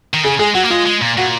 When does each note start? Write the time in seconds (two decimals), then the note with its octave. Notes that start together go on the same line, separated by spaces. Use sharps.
0.14 D#3
0.24 C#3 G#4
0.39 G#3 G#4
0.54 F#3 F#4
0.63 A#3
0.70 G#3 F4
0.86 G#3
1.02 A#2
1.18 A#2 F#4